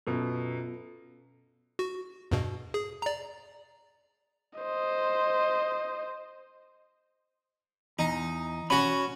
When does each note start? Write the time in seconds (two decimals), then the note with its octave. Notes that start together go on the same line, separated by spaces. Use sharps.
0.07 F#2 B2 B3 F4 A4
1.79 F#4
2.31 E2 G2 B2
2.74 G#4
3.02 D5 A#5
4.60 C5 D#5
7.99 E2 D#4
8.70 C#4 F#4 B5